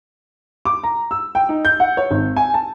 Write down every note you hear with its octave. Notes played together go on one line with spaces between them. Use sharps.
D6
A#5
E6
G5
D#4
G6
F#5
C#5
G#1
G#5
A5